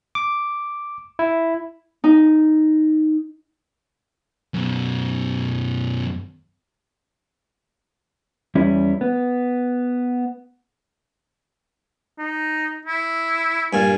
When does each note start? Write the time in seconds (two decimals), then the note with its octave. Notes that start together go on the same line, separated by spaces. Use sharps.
0.15 D6
1.19 E4
2.04 D#4
4.54 F#2 B2
8.55 E2 G3 C#4 E4
9.01 B3
12.18 D#4
12.85 E4
13.73 G2 A#2 G#5